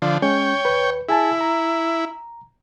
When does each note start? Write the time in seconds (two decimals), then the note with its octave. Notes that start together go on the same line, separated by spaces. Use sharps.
0.02 D3 F3
0.22 G#3 C#4 C#5 G5
0.65 D#2 B4
1.09 E4 G#4 G#5 A5
1.41 A#5